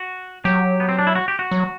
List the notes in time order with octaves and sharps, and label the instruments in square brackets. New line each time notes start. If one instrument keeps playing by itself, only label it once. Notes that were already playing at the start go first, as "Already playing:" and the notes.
Already playing: [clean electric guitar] F#4
[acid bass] F#3 [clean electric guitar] G4
[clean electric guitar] B3
C4
D4
E4
F#4
G4
F#4
[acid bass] F#3